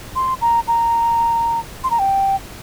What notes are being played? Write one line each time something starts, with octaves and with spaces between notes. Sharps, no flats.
C6
A#5
A#5
C6
A#5
G5